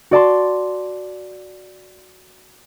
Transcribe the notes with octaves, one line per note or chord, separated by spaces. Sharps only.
F#4 D5 A5 C6